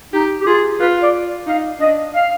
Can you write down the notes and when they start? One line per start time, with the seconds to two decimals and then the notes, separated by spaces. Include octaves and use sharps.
0.13 D#4 G4
0.41 G4
0.46 F4 G#4
0.80 F4 B4
1.02 D5
1.47 D#4 F5
1.80 D4 D#5
2.14 F5